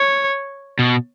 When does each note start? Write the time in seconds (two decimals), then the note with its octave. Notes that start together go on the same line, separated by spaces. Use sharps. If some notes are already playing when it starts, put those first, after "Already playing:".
Already playing: C#5
0.79 B2